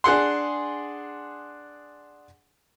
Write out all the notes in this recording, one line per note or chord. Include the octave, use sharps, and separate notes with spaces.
D4 G#4 F#5 C6